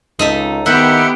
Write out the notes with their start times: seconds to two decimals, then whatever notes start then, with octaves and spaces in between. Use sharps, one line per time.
0.19 C#2 D#4 A4 E5
0.66 D#3 B3 E4 G4 E5 F#5 G5